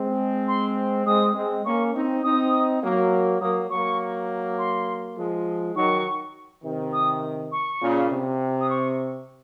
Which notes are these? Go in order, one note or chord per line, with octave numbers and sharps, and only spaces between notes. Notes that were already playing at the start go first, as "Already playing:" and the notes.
Already playing: G#3 C4
C6
G#3 C4 D#6
G#3 C4
A#3 C#4 C#6
C4 D#4
C4 D#4 D#6
F#3 A#3
F#3 A#3 D#6
F#3 A#3 C#6
C6
F3 G#3
D#3 F#3 C#6
C3 D#3
D#6
C#6
A#2 C#3
C3
D#6
C#6